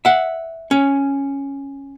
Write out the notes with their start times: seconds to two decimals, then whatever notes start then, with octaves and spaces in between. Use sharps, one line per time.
0.05 E5 F#5
0.71 C#4